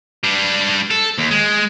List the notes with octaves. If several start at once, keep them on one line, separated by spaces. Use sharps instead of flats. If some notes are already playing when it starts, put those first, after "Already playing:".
G3 D4
A4
D#2
G#3